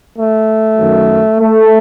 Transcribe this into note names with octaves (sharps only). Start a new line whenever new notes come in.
A3
F#2 D#3 F#3
A3